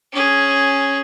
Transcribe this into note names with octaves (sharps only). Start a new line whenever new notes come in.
C#4 G#4